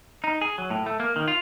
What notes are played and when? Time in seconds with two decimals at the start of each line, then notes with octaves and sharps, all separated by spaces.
0.24 D#4
0.41 G#4
0.58 F#3
0.70 A2
0.86 A3
1.00 A#3
1.16 D#3
1.28 F4